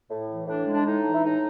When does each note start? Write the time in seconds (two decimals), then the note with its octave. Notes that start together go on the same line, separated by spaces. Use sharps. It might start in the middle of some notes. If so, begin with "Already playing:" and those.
0.09 A2
0.28 E3
0.47 A2 D4
0.67 G#3
0.74 D4
0.86 A2 D#4
1.05 E3
1.14 E4
1.24 A2 D#4